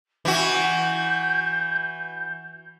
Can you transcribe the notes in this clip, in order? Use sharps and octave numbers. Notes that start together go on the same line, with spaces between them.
E3 F#4 G6